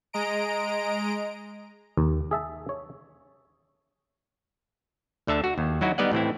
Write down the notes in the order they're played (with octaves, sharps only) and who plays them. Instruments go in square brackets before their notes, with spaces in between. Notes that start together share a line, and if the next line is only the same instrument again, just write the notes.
[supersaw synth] G#3 D#5 A#5 D7
[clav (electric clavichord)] D#2
G#4 E5 A5
C#5
D2 D3 E5 A5
F#4
D#2
F#3 D#4 E4 F#4
G3 B3 D#4 D5 D#5 F#5
A2 E3 C4 E4